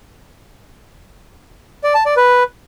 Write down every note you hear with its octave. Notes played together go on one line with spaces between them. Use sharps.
D5
A5
D5
B4